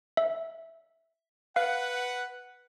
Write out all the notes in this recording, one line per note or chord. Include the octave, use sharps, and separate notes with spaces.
E5
B4 F5 F#5